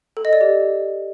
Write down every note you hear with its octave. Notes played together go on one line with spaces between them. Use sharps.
A4
D#5
D5
G4